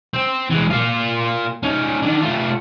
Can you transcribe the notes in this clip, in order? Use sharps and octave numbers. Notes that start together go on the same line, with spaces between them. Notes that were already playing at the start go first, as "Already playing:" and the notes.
C4
E3 G#3
A#3 F4
C#4 D#4
D3 D#3
A3 F4